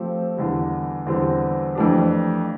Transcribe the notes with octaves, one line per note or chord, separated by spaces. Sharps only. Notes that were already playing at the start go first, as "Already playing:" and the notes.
Already playing: F3 A3 C4 G4
E2 D3 G3
E2 D3 G3 C4
F2 E3 A3 D4 G4